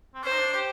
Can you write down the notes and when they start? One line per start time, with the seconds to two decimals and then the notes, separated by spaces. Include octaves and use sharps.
0.15 C4
0.24 C#4 C5
0.32 D#4
0.39 D4
0.54 G4